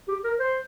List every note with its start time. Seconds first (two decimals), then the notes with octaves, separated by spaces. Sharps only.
0.08 G4
0.24 A#4
0.40 C5